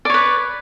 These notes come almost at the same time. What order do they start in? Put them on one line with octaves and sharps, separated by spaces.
D5 C#5 B4